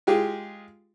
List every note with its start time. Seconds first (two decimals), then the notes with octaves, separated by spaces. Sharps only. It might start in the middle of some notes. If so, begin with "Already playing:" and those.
0.07 G#3 F4 G4 G#4